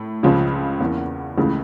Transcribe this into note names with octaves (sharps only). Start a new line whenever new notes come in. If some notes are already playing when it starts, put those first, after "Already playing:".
Already playing: A2
C#2 C#3 F3 C#4 F4
E2 E3 A#3 C#4 E4
C#2 C#3 E3 A3